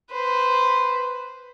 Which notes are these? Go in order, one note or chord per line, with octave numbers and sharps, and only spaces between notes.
B4 C5